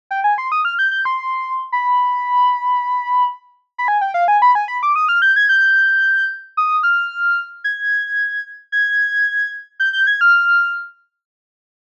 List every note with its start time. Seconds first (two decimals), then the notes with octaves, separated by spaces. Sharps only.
0.11 G5
0.24 G#5
0.38 C6
0.52 D#6
0.65 F6
0.79 G6
0.91 G6
1.05 C6
1.72 B5
3.78 B5
3.88 G#5
4.01 G5
4.14 F5
4.28 G#5
4.42 B5
4.55 G#5
4.68 B5
4.83 D6
4.96 D#6
5.09 F6
5.22 G6
5.36 G#6
5.49 G6
6.57 D#6
6.83 F6
7.64 G#6
8.72 G#6
9.80 G6
9.93 G6
10.07 G#6
10.21 F6